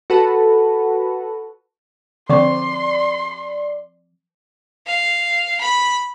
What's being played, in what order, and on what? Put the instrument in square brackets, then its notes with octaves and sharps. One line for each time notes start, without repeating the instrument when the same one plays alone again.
[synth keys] F#4 A4 B4
[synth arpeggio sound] D3 C5 [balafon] F3 C4 C#6 [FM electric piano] D5 [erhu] C6
[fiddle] F5
B5